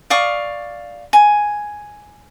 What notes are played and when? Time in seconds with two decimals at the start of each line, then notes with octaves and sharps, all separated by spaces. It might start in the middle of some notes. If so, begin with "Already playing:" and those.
0.10 D5 F5 C#6 D#6
1.13 G#5